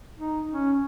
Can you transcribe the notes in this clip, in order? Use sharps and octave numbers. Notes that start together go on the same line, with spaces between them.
D#4
C#4